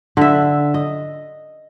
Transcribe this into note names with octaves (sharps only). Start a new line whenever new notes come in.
D3 E5
D#5